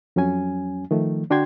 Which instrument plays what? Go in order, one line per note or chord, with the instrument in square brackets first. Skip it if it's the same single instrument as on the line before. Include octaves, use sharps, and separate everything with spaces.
[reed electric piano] F2 F#3 C#4 G#5
D#3 F3 A3
D3 D4 F#4 G5 C6 G#6